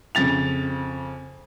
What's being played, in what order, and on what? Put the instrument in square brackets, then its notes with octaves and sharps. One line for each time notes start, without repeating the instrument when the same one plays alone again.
[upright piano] F2 C#3 A6 F7